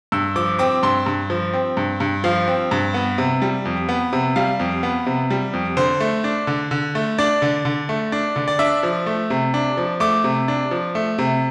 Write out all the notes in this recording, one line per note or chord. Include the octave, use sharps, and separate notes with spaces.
G2 E6
F3 D6
C4 D6
G2 C6
G2
F3
C4
G2
G2
F3 F5
C4
G2
B3
C3
G3
F2
B3
C3
G3 F5
F2
B3
C3
G3
F2
D3 C5
A3
D4
D3
D3
A3
D4 D5
D3
D3
A3
D4
D3
D5
D4 E5
F3
A3
C3
D4
F3
A3 D6
C3
D4
F3
A3
C3